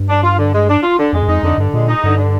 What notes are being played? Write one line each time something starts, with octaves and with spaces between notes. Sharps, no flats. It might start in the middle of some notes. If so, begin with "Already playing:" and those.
Already playing: G2
D4
F4
D3
G#3
D4
F4
D3
F2 G#3
G2
F2 D#4
F2 D3
G2 D3
A#2 G#3
D#4
G2 D3
D3